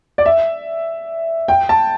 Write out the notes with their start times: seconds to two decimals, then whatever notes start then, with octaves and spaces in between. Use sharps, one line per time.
0.18 D5
0.26 E5
1.48 G5
1.69 A5